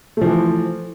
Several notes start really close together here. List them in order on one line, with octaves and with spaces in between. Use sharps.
A3 F3 E3